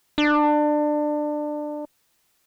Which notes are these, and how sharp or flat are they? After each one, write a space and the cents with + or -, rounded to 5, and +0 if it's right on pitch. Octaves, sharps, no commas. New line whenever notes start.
D4 +25